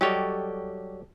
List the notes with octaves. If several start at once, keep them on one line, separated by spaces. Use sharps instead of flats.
F#3 G3 G4 A4 C#5 D#5